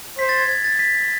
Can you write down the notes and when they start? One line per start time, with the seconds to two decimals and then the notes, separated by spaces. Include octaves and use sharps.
0.19 C5 B6
0.29 A6
0.39 G#6
0.49 G#6
0.64 A6
0.79 B6